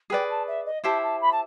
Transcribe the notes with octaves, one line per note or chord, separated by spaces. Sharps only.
G#4 B4 D5 G5
A5
E5
D#5
E4 G4 C5 E5 A5
A5
B5
A5